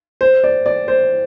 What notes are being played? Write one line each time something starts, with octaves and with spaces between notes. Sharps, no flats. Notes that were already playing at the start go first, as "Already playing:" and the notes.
C5
D5
D5
C5